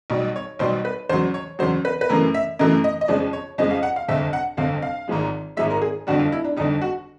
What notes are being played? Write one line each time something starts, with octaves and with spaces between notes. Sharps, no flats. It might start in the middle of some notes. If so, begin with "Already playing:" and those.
B1 B2 G3
C#5
B1 B2 G3 C5
B4
E2 C#3 F#3 C5
C#5
E2 C#3 F#3 C5
B4
B4
F#2 C#3 E3 A3 A#4
E5
F#2 C#3 E3 A3 D#5
D#5
D#5
F2 C#3 F3 G#3 D5
C#5
F2 C#3 F3 G#3 D#5
F5
F#5
F5
G1 F2 C3 E5
F#5
G1 F2 C3 F5
F5
G#1 G#2 F3 G#3
G#1 G#2 F3 G#3 E5
A#4
G#4
G1 F2 D3 G3 F#4
F4
E4
D4
G1 F2 D3 G3 D#4
F#4